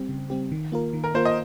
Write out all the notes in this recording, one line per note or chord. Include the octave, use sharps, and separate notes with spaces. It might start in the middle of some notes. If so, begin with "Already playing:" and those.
Already playing: G3 C4 G4
C#3
G3 C4 G4
D#3
A#3 F4 A#4
D#3
A#4
A#3 F4 A#4 C5
D#5